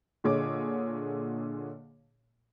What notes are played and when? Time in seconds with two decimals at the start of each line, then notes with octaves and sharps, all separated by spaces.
0.24 A#2 D3 G#4 C#5 D#5 D6